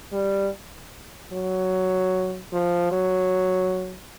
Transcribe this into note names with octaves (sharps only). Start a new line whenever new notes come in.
G3
F#3
F3
F#3